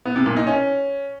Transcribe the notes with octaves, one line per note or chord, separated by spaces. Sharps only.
B3
C3
A#2
D#4
C#4